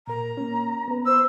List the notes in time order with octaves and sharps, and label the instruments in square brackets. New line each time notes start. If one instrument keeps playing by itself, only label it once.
[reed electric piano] A#2 A#4 [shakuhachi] A#5
[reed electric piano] A#3 C#4
B3 B4
[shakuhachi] C5 [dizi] E6